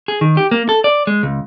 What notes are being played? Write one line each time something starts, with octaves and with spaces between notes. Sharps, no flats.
G#4
D#3
G4
A#3
A4
D5
G#3
C#2